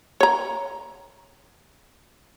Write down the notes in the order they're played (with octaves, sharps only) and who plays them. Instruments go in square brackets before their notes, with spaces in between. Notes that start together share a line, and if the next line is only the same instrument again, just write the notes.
[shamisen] C#5 A#5